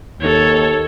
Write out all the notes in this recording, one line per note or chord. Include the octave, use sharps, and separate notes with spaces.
D#2 A4 C#5